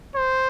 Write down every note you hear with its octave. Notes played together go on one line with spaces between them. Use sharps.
C5